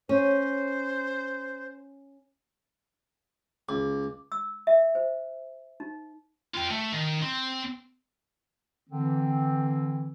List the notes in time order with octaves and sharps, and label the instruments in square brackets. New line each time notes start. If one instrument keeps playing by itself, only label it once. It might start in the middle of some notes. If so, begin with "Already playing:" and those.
[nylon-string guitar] C#4 [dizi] C5
[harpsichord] C#2 [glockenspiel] D6
[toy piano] E6
E5
C5
D#4
[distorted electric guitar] F4 G5
A3
D#3
C4
[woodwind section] D3 E3 C4